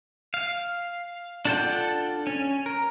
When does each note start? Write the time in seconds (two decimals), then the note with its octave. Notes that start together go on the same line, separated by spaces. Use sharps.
0.34 F5
1.45 D4 F4 A4 F#5 G5
2.27 C#4
2.66 A#4